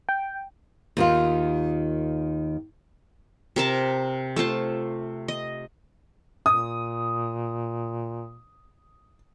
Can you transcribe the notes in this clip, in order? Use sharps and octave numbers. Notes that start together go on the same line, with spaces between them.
G5
D#2 D#3 F4
C3 A#4 A5
A3 F4 C5 A5
D#5
A#2 D#6